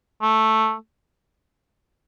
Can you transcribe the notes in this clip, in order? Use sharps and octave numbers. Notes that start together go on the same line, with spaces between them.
A3